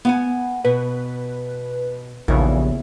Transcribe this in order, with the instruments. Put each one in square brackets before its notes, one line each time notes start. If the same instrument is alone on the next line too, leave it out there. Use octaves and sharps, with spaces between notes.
[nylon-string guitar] B3 F#5 G#5
[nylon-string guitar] B2 [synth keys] B4
[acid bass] A#1 [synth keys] D#2 C#3 B3 [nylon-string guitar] E3